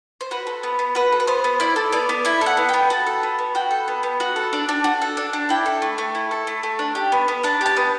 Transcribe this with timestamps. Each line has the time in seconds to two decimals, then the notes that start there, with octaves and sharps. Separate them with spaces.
0.21 C5
0.31 F#4 B4
0.47 A4
0.63 B3
0.79 B3
0.95 F#4 B4
1.12 A4
1.20 B4
1.27 B3 C5
1.44 B3
1.60 E4 D5
1.76 A4
1.92 B3 D5
2.09 B3
2.25 E4 E5
2.41 A4
2.46 F#5
2.57 B3
2.69 B3 G5
2.90 F#4 A5
3.07 A4
3.23 B3
3.39 B3
3.55 F#4 G5
3.71 A4
3.88 B3
4.03 B3
4.20 F#4
4.36 A4
4.53 D4
4.69 D4
4.84 F#4
5.02 A4
5.17 D4
5.33 D4
5.49 E4 G5
5.66 A4
5.82 A3
5.98 A3
6.15 E4
6.31 A4
6.47 A3
6.63 A3
6.79 D4
6.95 G4
7.12 B3
7.28 B3
7.43 D4 A5
7.61 G4 A5
7.77 B3